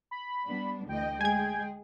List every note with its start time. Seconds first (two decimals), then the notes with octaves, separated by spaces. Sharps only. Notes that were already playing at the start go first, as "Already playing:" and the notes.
0.11 B5
0.46 G3 B3 D4
0.89 D2 E3 D#5 G5
1.21 G#3 G#4 G#5 G#6